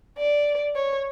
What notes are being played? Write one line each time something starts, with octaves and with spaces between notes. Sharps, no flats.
D5
C#5